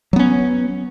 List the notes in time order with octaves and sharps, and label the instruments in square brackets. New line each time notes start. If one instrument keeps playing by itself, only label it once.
[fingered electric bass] F#3
B3
C#4